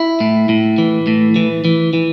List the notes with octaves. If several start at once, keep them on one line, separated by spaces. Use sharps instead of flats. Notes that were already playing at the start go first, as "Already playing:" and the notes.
Already playing: E4
A2
A2
E3
A2
E3
E3
E3